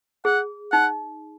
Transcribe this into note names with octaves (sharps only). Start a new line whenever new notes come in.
G#4 F#5
D#4 F#5